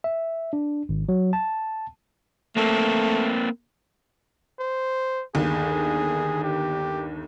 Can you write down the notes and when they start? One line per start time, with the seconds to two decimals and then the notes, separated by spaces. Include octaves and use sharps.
0.04 E5
0.53 D4
0.89 G#1
1.09 F#3
1.33 A5
2.57 A3 A#3 C4
4.59 C5
5.35 G1 D#2 G#4
6.44 G4